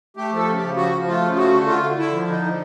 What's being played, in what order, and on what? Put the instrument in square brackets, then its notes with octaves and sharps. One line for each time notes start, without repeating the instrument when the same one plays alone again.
[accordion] A3 G4
F3 A4
C#3
G4
C#3
F3 F#4
F3
A3 F4
C#3
F4
A3 F#4
D3
D3 F4
D3
D3 E4
F3
D3 D#4
D3